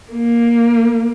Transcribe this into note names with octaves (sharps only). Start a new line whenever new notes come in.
A#3